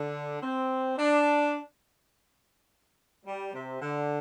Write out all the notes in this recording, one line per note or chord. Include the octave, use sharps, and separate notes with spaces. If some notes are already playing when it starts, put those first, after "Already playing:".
Already playing: D3
C4
D4
G3
C3
D3